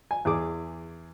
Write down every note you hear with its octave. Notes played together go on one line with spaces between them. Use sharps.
G#5
E2 G#4 D6